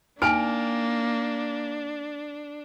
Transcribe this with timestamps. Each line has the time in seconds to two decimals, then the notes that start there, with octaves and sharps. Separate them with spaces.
0.22 A#3 D4 D#4 G5 G#5 F6 D7